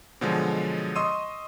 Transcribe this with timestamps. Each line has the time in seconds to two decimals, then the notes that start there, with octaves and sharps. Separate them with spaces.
0.21 B2 D3 F3 F#3 G#3
0.96 D#5 C6 C#6 D#6 E6 D#7